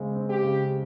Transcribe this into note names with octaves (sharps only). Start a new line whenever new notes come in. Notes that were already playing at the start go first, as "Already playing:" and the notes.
Already playing: C#3 G#3 C4
C4
G4
C#3